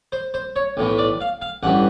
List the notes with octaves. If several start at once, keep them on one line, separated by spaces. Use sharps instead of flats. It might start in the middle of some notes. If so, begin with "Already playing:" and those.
C5
C5
C#5
B1 A2 E3
D5
F5
F5
A1 G2 E3 F#5